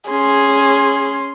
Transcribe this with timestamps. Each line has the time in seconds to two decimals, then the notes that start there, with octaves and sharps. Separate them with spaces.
0.10 C#4 G#4 C6